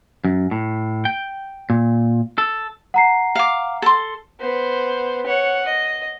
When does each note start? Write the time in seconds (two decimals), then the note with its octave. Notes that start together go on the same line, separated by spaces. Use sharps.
0.24 F#2
0.51 A2
1.05 G5
1.70 A#2
2.38 A4
2.94 F#5 A#5 C7
3.35 F5 D6
3.82 A4 C6
4.40 B3 C5
5.26 C#5 F#5
5.65 D#5